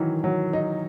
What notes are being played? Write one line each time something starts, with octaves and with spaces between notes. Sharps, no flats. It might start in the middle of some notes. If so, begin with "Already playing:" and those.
Already playing: D#3 E3 F#3
F#3
D#4